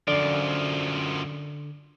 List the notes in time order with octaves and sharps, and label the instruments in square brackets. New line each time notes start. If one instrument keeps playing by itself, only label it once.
[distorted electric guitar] F#2 F3 [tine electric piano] D3 [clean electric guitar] D5